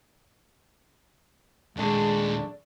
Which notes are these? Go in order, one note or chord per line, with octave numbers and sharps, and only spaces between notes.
D#2 A#2 G#3 A3 D4 G#4